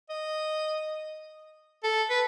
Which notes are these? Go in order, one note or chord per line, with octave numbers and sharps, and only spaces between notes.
D#5
A4
B4